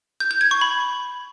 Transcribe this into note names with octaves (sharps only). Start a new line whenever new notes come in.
G6
G6
G#6
C#6
B5